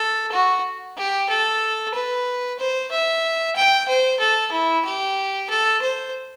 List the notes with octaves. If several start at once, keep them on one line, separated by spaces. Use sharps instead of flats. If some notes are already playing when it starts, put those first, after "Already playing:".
Already playing: A4
F#4
G4
A4
B4
C5
E5
G5
C5
A4
E4
G4
A4
C5